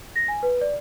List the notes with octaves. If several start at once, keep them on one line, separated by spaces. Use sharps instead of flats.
A#6
G#5
B4
D5